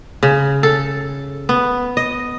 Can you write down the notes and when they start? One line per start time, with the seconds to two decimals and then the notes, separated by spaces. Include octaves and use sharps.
0.23 C#3
0.63 A4
1.49 B3
1.97 D#5